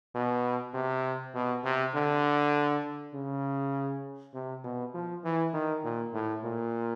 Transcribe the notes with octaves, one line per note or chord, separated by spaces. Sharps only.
B2
C3
B2
C3
D3
C#3
C3
B2
F3
E3
D#3
A#2
A2
A#2